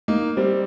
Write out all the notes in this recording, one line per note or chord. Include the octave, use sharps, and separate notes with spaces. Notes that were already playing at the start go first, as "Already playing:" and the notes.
A#3 D#4
G3 C4